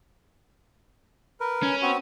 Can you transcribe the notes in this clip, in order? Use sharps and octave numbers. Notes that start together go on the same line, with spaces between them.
A#4 B4
C#4
B3 C4 F#4